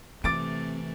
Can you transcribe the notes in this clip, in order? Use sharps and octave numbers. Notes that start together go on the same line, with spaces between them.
C3 E3 A3 C4 D6 A6 D7